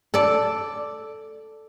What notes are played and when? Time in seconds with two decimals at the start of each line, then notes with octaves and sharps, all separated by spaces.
0.14 A4 D5